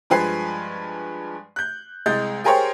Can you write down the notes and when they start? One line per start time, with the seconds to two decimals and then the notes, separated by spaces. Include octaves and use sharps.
0.10 G2 F3 G#3 B4 G#5 C7
1.56 F#6 G6
2.06 C2 G#3 D#5 G6 A6
2.44 G4 G#4 A#4 C5 C#5 G5